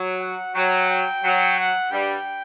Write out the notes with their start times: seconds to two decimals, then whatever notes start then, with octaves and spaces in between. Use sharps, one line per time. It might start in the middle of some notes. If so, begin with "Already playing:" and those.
Already playing: F#3
0.21 F#5
0.55 F#3 G5
0.89 G5
1.23 F#3
1.58 F#5
1.91 G2 G3 G5